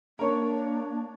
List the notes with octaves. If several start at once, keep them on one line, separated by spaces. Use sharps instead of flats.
A#3 D4 A#4 C#5 C#6